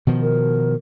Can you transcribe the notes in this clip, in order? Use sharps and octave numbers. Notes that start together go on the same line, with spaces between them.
B2 D#3 F3
A#4